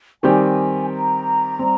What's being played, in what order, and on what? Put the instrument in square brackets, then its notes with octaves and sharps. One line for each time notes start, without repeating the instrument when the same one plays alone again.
[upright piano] D#3 G3 C4 G4 [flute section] G#5
[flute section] A#5
[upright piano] G3 C4